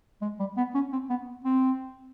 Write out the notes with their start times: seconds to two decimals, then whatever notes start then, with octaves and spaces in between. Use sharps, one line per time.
0.22 G#3
0.40 G3
0.57 B3
0.75 C#4
0.93 C4
1.10 B3
1.45 C4